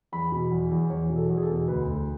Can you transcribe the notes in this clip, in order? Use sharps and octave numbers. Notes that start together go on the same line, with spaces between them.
E2 B5
B2
E2
E2
E2 C#5
B2
A4
E2
G#4
A4
B2
D2 B4
D2